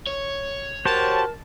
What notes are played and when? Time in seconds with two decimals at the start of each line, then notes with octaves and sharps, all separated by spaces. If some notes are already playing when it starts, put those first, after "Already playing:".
0.07 C#5
0.85 F#4 G4 A#4 C5 A5